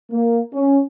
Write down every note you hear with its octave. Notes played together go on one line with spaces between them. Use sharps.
A#3
C#4